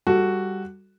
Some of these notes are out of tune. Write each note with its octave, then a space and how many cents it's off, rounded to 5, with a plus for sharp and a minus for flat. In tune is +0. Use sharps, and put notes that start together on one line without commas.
G3 +0 F#4 +0 A4 +0